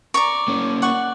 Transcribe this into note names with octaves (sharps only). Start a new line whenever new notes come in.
D5 A#5 C#6
A#3 C#4
D5 F#5 C#6